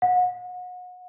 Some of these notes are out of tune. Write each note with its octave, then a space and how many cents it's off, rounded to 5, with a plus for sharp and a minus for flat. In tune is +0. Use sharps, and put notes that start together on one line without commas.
F#5 -35